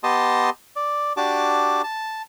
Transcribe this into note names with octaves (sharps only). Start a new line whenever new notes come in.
B3 G4 D#5 A5 C6 D#6
D5
D4 F#4 G4 A5 D6
A5